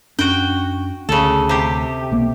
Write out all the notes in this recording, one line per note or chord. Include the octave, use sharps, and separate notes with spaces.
F#2 C#4 D4 F#4 G5
D2 C#3 A4
C3 G4
B1 A#3 B3